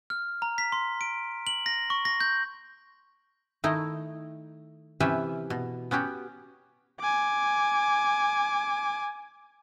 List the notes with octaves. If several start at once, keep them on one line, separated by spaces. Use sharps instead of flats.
F6
A#5
B6
C6
D7
F#7
A#6
C#6
A#6
G6
D#3 A3 D#4 E4
C3 E3 C#4 G4 B4 E5
B2
B3 C#4 F#4 G4
G#5 D6